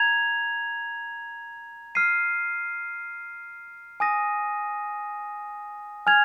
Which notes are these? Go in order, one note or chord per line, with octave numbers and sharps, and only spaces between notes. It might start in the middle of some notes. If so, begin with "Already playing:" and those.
Already playing: A#5 G#6 F7
F6 C7 D#7
G#5 D#6 A#6 D#7
G#5 F6 G#6 F7